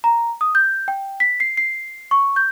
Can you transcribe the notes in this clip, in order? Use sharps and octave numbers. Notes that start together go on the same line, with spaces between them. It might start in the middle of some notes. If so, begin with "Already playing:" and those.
A#5
D#6
G6
G5
B6
C7
C7
C#6
G6